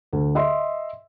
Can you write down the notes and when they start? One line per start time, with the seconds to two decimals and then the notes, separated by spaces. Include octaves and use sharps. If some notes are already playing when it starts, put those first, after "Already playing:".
0.13 D2
0.35 D#5 E5 C6